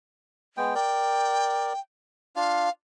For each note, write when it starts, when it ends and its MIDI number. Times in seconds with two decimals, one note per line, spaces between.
0.57 0.74 56
0.57 0.74 59
0.57 0.74 79
0.75 1.73 70
0.75 1.73 74
0.75 1.80 79
2.36 2.69 62
2.36 2.69 65
2.36 2.70 77